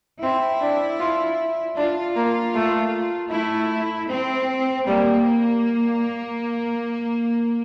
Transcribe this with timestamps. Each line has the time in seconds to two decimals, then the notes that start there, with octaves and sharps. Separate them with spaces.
0.22 C4 E4
0.61 D4
1.00 F4
1.77 D4 F4
2.16 A#3
2.55 A3
3.31 A3 E4
4.09 C4
4.87 G3 A#3